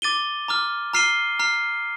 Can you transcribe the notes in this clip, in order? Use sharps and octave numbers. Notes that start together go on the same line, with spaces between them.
D6 A6 D#7 G7
A#5 D6 F6
A#5 F6 C7 D#7 G7
A#5 F6 C7